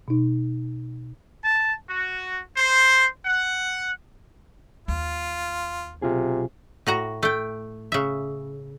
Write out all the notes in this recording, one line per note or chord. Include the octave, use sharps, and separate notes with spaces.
B2 D#4
A5
F#4
C5
F#5
D#2 F4
B1 C3 F4 G#4
A2 F#4 A#5
A3 G5
C#3 E5